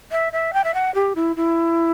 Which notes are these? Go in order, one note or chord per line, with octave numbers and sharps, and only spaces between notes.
E5
E5
G5
E5
F#5
G4
E4
E4